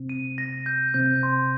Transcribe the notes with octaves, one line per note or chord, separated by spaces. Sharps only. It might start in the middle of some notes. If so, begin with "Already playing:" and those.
Already playing: C3 C4
D#7
A#6
G6
C3 C4 G6
C6